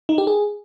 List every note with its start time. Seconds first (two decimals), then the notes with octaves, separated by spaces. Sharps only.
0.09 D#4
0.18 G4
0.27 G#4